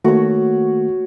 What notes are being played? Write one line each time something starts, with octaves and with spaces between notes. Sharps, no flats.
D#3 A3 A#3 F#4 C#5